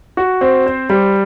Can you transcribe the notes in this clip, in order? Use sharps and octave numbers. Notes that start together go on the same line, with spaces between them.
F#4
C4
C5
G3